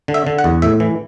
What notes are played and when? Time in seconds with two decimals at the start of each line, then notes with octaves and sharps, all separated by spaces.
0.08 D3
0.14 E5
0.27 D3
0.39 F#5
0.44 E2
0.62 A2 E5
0.80 E3